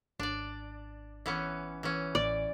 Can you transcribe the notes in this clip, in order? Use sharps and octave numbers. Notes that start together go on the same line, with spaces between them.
G#1 D4 D5
E3 B3 C#4
E3 C#4
A1 D5